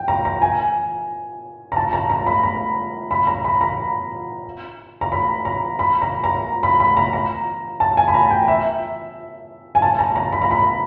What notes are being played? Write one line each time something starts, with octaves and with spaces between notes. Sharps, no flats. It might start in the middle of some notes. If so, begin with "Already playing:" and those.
Already playing: G5
A#5
A#5
G#5
A#5
A5
A#5
A#5
B5
A#5
B5
A#5
B5
A#5
A#5
B5
A#5
B5
A#5
A#5
B5
B5
A#5
A#5
A5
G#5
B5
A#5
G5
E5
G#5
A5
A#5
A#5
B5
A#5
B5